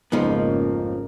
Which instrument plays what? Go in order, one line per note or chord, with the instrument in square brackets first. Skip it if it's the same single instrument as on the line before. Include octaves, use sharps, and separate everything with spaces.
[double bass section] G#1 C#3 A#3 [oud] F2 G#3 D#4 [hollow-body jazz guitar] F3 B3